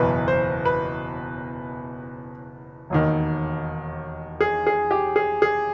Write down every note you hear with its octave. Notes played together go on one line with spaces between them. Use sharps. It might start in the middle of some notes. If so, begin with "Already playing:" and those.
Already playing: F#1 E2 B2 B4
C5
B4
E1 D#2 D#3
G#4
G#4
G4
G#4
G#4